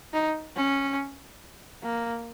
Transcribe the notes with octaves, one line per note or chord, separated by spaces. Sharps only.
D#4
C#4
A#3